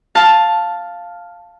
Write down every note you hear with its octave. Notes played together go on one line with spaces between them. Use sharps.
F5 A5